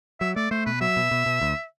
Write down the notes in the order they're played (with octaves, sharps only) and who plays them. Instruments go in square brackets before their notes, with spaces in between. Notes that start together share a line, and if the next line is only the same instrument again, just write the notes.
[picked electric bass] F#3 [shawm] E5
[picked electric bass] A3 [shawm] D5
[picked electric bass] A3 [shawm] C5
[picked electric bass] B2 [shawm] B4
[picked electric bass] F#3 [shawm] E5
[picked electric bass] B2
B2
B2
D2